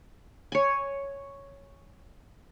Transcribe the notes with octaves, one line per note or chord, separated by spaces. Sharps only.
C#5 G#5